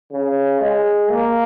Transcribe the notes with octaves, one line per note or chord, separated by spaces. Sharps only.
C#3
G#3
A#3